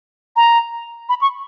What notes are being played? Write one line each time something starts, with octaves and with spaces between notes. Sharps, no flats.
A#5
B5
C#6